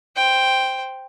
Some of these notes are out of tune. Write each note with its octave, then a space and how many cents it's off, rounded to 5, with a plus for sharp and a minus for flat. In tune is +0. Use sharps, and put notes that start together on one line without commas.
C5 +0 G5 +0